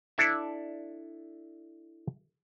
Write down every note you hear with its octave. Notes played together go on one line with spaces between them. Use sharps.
D4 E4 A4 D5 E5